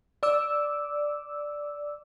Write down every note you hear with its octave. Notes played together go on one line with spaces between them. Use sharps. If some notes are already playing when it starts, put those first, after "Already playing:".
D5 D6 E6